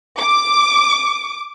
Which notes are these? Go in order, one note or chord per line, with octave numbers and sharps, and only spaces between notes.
D6